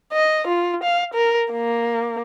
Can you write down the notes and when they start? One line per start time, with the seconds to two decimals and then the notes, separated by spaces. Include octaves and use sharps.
0.13 D#5
0.47 F4
0.83 F5
1.14 A#4
1.52 A#3